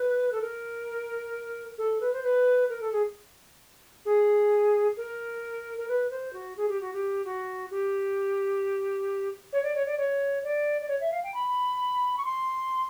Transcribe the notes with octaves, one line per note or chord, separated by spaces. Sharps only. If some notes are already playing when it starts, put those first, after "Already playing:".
Already playing: B4
A4
A#4
A4
B4
C5
B4
A#4
A4
G#4
G#4
A#4
A#4
B4
C5
F#4
G#4
G4
F#4
G4
F#4
G4
C#5
D5
C#5
D5
C#5
D5
D5
C#5
E5
F5
G5
B5
C#6
C6